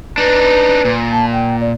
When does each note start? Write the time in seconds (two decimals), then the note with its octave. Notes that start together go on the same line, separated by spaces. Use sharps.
0.18 D4 D#4 B4
0.85 A#2
1.12 A5
1.32 G5
1.61 D5